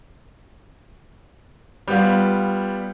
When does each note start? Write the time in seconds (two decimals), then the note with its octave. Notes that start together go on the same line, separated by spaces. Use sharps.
1.88 G3 B3 F4